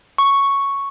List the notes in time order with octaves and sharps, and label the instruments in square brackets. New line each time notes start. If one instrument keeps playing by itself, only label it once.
[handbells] C#6